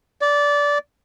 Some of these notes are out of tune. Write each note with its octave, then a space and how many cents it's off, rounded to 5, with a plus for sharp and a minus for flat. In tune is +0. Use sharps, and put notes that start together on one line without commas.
D5 -20